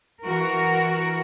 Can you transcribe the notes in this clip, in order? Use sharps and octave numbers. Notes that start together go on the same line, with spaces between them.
E3 F#4 A#4